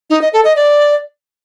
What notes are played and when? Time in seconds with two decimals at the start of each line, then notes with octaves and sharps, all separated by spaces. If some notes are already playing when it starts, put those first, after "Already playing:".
0.10 D#4
0.22 D#5
0.33 A4
0.45 D#5
0.56 D5